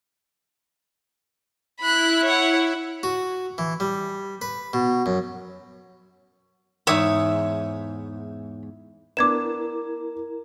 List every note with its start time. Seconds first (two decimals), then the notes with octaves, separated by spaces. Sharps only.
1.80 E4 B5 F#6
2.24 C#5 F#5
3.03 F#4
3.58 E3
3.80 G3
4.42 B4
4.73 B2
5.06 F#2
6.87 E2 G#2 C#5 E5 D#6
9.17 B3 D4 E4 A#4 A#5 D6 G#6 E7